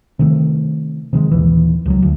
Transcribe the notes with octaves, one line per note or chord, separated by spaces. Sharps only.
C3 D#3 A3
C3 D#3 F#3 G#3
A#1 D#2 E3
C#2 F3 F#3
D2